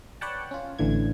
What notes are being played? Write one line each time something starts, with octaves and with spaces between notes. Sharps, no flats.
B4 C#5 D5 F#5 G5 A5
C#4 F4
A1 D3 E3 G#6